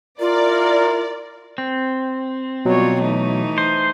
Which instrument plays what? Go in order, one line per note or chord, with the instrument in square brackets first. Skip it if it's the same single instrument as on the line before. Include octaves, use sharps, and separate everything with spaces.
[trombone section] E4 A#4 [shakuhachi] F4 [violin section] D5
[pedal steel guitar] C4
[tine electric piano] B2 F#3 [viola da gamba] G3 F4 C#5
[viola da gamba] E3 A3 D#4
[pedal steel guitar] C5